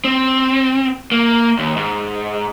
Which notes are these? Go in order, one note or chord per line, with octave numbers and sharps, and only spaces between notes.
C4
A#3
D#2
G#2